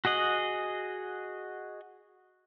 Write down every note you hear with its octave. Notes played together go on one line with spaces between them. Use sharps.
F#4 G#4 D#5 F#5